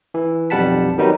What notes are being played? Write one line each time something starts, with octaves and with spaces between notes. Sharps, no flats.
E3
B1 F2 G3 F#5 A5 B6
D#3 F#3 G3 B3 D#4